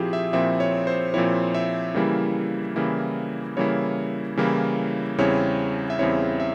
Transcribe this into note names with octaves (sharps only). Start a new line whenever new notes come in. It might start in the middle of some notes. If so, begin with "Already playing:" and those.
Already playing: A#2 F3 C4 E4 G4 G#4 C5
E5
A#2 F3 C4 E4 E5
C#5
C5
A#2 F3 C4 E4 C#5
E5
C#3 E3 G3 A#3 E4
C#3 E3 G3 A#3 E4
C#3 E3 G3 A#3 E4 C#5
C#3 E3 G3 A#3 E4
E2 C#3 G3 C4 E4 C#5
E5
E2 C#3 G3 C4 E4 C#5
E5